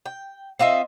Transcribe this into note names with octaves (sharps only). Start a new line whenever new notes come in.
G5
C4 F4 D#5 E5